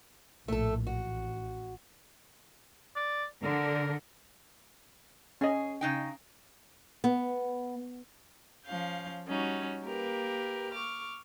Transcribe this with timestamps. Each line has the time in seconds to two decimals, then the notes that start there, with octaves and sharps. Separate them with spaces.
0.48 A#1 A2 A3 A4
0.87 A1 F#4
2.96 D5
3.43 D3 A#4
5.41 C#4 G#4 D#5
5.81 C#3 D#4 G5
7.04 B3
8.65 F3 C#4 F5 G6
9.26 G3 C#4 D#4 F#4
9.84 A#3 G4 A#4 B4
10.72 C#6 D6 F6